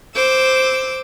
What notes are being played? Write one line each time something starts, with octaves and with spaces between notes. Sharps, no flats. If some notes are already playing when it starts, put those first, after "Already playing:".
C5 D6 E6